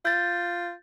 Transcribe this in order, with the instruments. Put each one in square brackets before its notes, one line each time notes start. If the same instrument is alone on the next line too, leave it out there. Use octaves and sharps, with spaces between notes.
[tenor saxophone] F4 [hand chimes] G6 A6